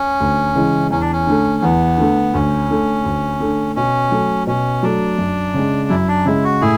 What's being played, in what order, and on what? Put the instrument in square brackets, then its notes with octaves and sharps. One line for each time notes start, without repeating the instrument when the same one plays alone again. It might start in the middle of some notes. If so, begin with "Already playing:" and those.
Already playing: [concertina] C#4
[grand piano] D2
C#3 E3 G#3
[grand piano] E2 [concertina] C#4
[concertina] D4
C#4
[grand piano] D3 A3
[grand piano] E2 [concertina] B3
[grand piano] D3 A3
[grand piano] D2 [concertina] C#4
[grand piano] D3 A3
D2
D3 A3
[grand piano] B2 [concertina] C#4
[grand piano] F#3 A3
[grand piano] B2 [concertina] C#4
[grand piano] F#3 A3 [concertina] D4
[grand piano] F#2
C#3 G#3
[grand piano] F#2 [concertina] E4
[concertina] D4
[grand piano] C#3 G#3 [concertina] E4
[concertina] F#4
[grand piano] A2 [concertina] E4 G#4